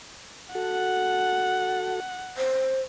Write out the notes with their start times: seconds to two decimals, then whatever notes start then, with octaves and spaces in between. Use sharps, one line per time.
0.55 F#4 A4 F#5
2.37 C5